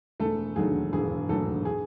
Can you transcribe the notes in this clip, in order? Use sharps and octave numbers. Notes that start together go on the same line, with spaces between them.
E1 A3 A4
D#2 D3 F#3 A3 G#4
E1 G#4
D#2 D3 F#3 A3 A4
G#4